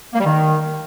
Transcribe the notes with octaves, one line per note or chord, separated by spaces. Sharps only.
A#3
G3
D#3